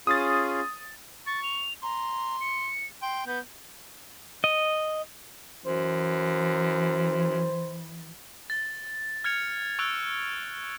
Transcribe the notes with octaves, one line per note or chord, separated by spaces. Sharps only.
C#4 F4 G#4 D#6 A6
C#6 A6
F7
A#5 C6
C#7
G5 C6
B3 G6
D#5
F#2 E3 C5
A6
F6 G#6 C#7 F7
C#6 E6 F#6 D7 F7